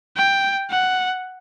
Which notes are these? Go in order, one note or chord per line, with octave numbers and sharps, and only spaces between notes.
G5
F#5